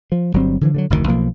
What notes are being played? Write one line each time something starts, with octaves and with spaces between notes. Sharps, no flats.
F3
G1 F#3 G3 C4
D3 E3 F3
D3 F3 F#3
F1 D2 A#2 D#3
B1 F3 A#3